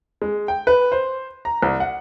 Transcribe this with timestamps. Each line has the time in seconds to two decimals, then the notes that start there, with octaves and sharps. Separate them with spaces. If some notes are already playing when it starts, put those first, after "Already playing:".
0.22 G#3
0.48 G5
0.67 B4
0.92 C5
1.45 A#5
1.63 C2
1.80 F#5